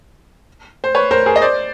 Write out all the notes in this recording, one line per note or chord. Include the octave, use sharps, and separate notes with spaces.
C5
B4 C#5
A#4 C5
G#4 A#4
D#5
C5 D5